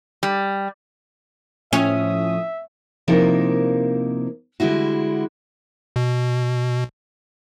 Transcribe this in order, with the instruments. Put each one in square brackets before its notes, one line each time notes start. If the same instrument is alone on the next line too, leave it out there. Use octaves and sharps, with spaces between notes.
[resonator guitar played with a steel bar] G3
[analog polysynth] A2 F3 D#6 [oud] C#4 [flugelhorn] E5
[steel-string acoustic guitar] C3 F3 A#3 D#4 E4 A#4
D3 G3 G#3 E4 F#4
[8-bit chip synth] B2